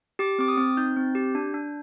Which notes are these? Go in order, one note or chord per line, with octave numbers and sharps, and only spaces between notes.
G4 D6
C4 D6
D#6
C4
D#4 G6
C4
G4
D4
D4